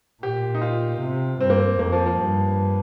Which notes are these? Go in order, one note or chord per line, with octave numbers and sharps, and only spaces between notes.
A#2 G4
D#4
F4
C3
G2 C4
A#3
C4
F2 A#3
F3
F3
G2